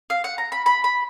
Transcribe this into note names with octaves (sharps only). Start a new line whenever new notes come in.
F5
F#5
A#5
B5
B5
B5